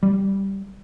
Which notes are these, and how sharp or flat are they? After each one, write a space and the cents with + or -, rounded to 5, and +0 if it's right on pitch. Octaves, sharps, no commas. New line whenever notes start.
G3 -5